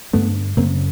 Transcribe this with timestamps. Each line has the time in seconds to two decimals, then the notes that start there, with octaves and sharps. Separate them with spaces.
0.13 G2 D3 A3 B3
0.57 F#2 C#3 A#3 C4